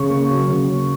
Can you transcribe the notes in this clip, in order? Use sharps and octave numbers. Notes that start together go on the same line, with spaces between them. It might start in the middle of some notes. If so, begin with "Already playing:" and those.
Already playing: C#3 C#6
A#3
F#3
C#3
C#3